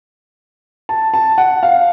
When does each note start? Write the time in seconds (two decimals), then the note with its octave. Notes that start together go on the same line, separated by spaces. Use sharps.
0.89 A5
1.14 A5
1.38 F#5
1.63 F5